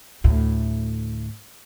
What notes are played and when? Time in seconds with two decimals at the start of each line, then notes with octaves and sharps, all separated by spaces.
0.24 D2 A2